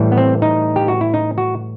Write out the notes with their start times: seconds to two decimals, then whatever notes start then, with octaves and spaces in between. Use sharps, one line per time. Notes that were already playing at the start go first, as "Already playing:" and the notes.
Already playing: A2 E3 G3
0.12 B3
0.18 C4
0.42 D#4
0.76 G4
0.88 F#4
1.01 E4
1.14 D#4
1.38 F#4